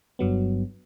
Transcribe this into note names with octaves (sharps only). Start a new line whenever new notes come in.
G1 G2 F#3 B3